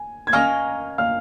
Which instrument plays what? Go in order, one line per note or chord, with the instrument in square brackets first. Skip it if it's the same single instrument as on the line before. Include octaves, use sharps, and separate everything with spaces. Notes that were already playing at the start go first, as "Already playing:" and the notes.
Already playing: [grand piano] G#5
G#6
[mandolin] A#3 C#4 A#4 D#5 [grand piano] F5 F6
[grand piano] F5 F6